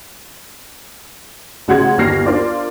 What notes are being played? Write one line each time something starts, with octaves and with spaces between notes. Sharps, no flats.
A1 C#3 F#4 F#5 C6 G#6
G1 D#2 G4 F6 A#6 C7
D4 F4 A#4 C5 D5